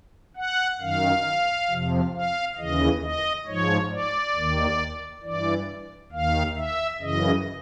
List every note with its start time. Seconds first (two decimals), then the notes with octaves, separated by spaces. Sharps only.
0.37 F#5
0.81 F#2 D#3 F5
1.70 F2 C3 F3
2.14 F5
2.58 D#2 C#3 E3 D#5
3.02 D#5
3.46 G#2 F3 C#5
3.91 D5
4.35 D#2 D#3
5.23 G2 E3 D5
6.12 D#2 D#3 F5
6.56 E5
7.00 F#2 C#3 E3 D#5